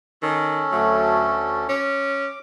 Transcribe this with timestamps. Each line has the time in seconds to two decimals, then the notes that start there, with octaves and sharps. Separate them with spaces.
0.22 D#3 C#4 A4
0.72 D2 F#3 A3
1.69 C#4 D6